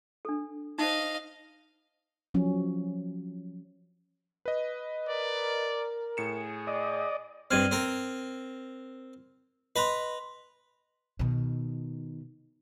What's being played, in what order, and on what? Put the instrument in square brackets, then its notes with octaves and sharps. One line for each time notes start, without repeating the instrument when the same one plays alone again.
[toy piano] D4 A4
[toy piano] D#4 C5 [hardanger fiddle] D#5 F5
[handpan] F3 F#3 C#4
[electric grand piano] B4 D#5
[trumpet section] A#4 [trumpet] D5
[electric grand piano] A2 C#7 E7 [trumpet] G#4
[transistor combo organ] D5 D#5
[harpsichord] G2 C4 [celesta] F6 G#6 D#7
[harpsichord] C4 A#4
[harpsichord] B4 A#5 [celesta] D#5 C6
[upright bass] B2 D#3